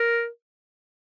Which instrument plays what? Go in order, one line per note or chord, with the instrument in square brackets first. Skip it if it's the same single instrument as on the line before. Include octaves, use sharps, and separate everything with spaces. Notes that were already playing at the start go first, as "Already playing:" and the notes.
Already playing: [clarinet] A#4